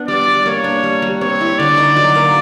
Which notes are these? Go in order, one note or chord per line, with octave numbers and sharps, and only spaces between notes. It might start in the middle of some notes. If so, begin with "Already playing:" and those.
Already playing: B3 D4
G3 D5
G3
A#3 C#5
D4
G3
G3
C4 C#5
E4
D3 D5
D#4
F#3
A#3